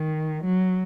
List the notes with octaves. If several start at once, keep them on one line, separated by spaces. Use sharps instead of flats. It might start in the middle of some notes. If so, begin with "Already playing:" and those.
Already playing: D#3
F#3